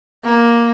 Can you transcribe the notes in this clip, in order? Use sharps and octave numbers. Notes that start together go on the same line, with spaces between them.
A#3